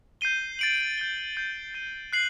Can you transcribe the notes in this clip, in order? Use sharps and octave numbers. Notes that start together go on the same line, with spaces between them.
G6 C7 D#7 G7
A6 D7 F#7
G6 D7 G7
G6 C7 F#7
A6 D#7 G7
F#6 C7 F#7